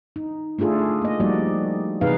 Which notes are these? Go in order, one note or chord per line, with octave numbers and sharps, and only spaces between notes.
D#4
A3 D4 F4 G#4 A4
A#3 D#5
F3 G3 A#3 D#4 F#4 D5
C3 E3 D#4 G#4 B4 F5